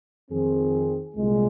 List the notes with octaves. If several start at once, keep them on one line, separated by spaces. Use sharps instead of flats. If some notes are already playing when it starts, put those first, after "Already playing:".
F2 D#3 C4 G#4
C2 A#2 G#3